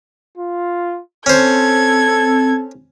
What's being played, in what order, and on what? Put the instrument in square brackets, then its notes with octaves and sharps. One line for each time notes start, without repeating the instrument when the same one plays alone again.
[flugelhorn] F4
[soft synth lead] C4 [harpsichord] C#4 C5 [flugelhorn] A4 [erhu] G#6